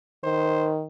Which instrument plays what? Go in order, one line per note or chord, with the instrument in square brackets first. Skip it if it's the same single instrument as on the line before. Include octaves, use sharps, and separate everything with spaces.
[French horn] D#3 [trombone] C5